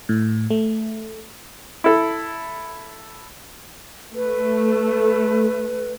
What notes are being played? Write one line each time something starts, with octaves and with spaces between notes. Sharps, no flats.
A2
A3
E4 A4
A3 B4